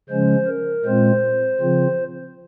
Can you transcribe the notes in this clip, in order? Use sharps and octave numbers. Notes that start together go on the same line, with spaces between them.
C#3 F3 G#3 C#4 C5
A#4
A#2 G#3 C4 F4 C5
C#3 F3 C4 F4